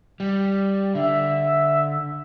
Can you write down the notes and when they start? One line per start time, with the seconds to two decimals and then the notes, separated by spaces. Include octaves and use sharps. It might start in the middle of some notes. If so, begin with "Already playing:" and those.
0.20 G3
0.95 D3 E5